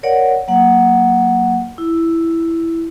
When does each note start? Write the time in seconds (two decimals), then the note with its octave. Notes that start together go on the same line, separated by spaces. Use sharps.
0.03 A#4 C#5 D5 F5 F#5
0.48 F#3 A#3 F#5
1.78 E4